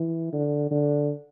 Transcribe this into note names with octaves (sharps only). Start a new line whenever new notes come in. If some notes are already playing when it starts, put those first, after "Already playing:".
Already playing: E3
D3
D3